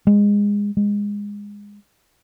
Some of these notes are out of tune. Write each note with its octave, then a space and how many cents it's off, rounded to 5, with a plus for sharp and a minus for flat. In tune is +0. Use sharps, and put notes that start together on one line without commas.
G#3 -20
G#3 -20